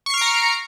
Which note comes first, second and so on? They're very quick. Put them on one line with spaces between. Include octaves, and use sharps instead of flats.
C#6 C7 F6 D7 A#5